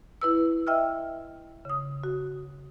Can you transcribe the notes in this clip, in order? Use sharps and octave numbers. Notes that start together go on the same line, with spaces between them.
E4 B4 E6
D#5 E5 G5 E6 F6
C#3 D#6
F#4